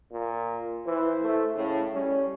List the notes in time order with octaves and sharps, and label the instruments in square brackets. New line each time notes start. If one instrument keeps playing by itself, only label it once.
[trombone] A#2
[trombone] E3 [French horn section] E4 C5
[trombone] A3
[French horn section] A2 [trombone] C#3
[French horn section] G3 [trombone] C#4